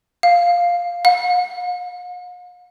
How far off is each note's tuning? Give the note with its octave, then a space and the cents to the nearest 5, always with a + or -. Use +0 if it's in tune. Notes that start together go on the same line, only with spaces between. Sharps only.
F5 +5
F5 +45